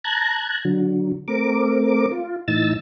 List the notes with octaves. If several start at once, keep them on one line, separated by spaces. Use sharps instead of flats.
A5 A#5 F#6 G#6
D3 F#3
A3 C4 A#4 D6
F4
A2 E3 D#4 E6 A6